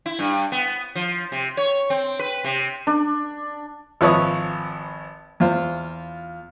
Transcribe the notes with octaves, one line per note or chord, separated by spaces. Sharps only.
E4
G2
B3
F3
C3
C#5
C4
B4
C3
D4
G#1 F3 B4 C#5 E5 D#6
E2 F4 C5